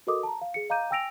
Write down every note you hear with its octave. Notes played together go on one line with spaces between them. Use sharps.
F#4 A4 A#4 D#5 D6 D#6
A5 A#5
F5
G#4 C#7
D#5 F5 A#5 D6 G6 D#7
G5 G#5 E6 A#6 D7 F7